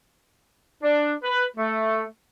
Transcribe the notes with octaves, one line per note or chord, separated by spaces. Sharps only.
D4
B4
A3